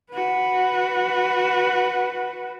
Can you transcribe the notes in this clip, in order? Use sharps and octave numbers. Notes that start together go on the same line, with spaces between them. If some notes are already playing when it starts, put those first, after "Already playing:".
F#4 B4